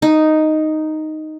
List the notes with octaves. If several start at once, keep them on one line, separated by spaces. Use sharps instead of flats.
D#4